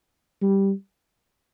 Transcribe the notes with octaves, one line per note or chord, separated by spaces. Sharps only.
G3